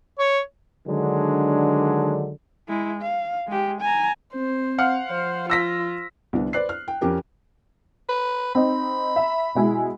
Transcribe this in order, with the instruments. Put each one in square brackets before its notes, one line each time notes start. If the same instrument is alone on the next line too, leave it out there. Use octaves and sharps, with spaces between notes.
[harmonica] C#5
[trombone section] D3 D#3 F#3 G#3 D4
[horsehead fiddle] G#3 E4
F5
G#3 G4
G#5 A#5
[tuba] C4 [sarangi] C5
[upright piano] F5 F#5 F6
[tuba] F3 [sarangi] C5
[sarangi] F4 [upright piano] E6 A#6 B6
[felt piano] C2 D3 B3
B4 C5 D5 F#6 C7
F6
G5
F2 C#4 G4 A#4
[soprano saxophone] B4
[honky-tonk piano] C4 D#4 [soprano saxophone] B5
[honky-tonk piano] E5
B2 G#3 E4